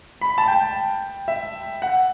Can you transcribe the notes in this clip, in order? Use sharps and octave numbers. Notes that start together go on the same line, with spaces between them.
B5
A5
G5
E5
F#5